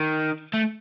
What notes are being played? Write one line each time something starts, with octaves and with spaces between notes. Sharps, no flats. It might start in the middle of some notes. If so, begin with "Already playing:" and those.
Already playing: D#3
A3